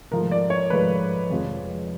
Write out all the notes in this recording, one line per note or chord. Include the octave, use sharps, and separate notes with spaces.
G#2 F3 A3 A#4
D5
C#5
G#2 F3 A3 B4
F2 C3 F3 G#3